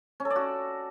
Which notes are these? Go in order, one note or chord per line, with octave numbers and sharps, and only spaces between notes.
C#4
A4
D5
F#4